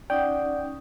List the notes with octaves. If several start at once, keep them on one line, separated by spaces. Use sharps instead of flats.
C#4 D#4 D5 F#5 G5